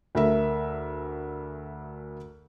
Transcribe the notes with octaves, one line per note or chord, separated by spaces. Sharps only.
D2 A3 A#4 E5